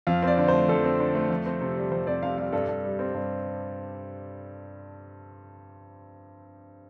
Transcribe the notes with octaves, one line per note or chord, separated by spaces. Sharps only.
F2 F5
C4 D5
D3
C5
A3
F2 A4
C4
D3
A3
F2
C4
C3
G3
F2 C5
C4 D5
C3 F5
G3 F5
G2 A4
G2
G3
C4
G2